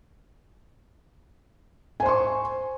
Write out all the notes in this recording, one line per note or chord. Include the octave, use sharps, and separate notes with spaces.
C5 G#5 C6 C#6